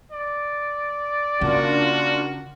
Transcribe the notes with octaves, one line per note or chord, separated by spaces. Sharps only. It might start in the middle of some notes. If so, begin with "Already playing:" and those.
D5
C#3 A#3 D4 F4 F#4